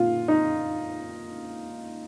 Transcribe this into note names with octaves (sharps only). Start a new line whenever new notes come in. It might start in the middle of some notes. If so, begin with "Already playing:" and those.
Already playing: A#2 F4
D#4